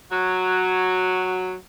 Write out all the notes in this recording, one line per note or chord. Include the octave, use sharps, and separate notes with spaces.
F#3 F#4